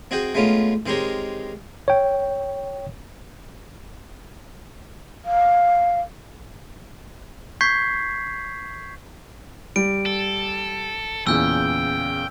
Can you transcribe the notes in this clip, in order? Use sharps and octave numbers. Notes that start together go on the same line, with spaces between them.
C4 F#4 G#4 D#5 G5
G#3 A3 B3 C#4 F4
D#3 G#3 C4 G4 A#4 C#5
C#5 G5
F5
C#6 G6 G#6 B6 C7
G3 D7
A4
E2 A#2 C#3 G5 E6 G6